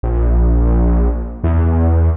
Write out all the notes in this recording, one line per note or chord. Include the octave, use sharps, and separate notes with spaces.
A#1
E2